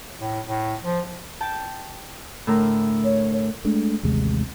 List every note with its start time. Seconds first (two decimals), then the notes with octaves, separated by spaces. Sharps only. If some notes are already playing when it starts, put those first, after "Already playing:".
0.19 A2
0.48 A2
0.83 F3
1.41 G5 A5
2.47 A2 D3 A#4
3.04 C#5
3.65 G#3 A3 D4
4.03 A1 D#2 C3 G#3